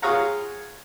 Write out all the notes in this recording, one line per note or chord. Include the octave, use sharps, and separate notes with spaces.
F4 G#4 C#5 F5 F#5 A#5